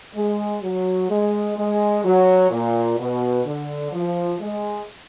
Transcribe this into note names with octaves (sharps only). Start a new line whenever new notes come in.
G#3
F#3
G#3
G#3
F#3
A#2
B2
D3
F3
G#3